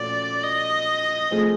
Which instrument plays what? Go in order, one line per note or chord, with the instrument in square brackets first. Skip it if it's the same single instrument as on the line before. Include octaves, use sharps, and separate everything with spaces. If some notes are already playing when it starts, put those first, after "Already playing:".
Already playing: [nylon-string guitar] A#2 F3 A3 C#4 F#4 [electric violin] D5
[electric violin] D#5
[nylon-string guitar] F3 A3 C4 F4 G#4